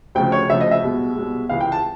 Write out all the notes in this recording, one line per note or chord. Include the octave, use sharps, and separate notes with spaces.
D2 C#3 F3 G5
C#5
D2 C#3 F3 E5
D#5
E5
C2 B2 G#3
C2 B2 G#3
C#2 C3 E3 G#3 F5
G5
A5